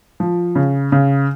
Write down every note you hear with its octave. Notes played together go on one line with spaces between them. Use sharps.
F3
C#3
C#3